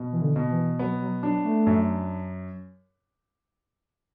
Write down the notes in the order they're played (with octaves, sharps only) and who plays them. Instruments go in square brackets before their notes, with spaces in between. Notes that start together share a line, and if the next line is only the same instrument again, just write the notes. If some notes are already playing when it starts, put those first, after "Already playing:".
Already playing: [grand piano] B2
[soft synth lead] E3
D3
[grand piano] B2
[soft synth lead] E3
[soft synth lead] F#3 [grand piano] B3
[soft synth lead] F#3
[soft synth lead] F#3 [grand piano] D4
[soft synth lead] A3
[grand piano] F#2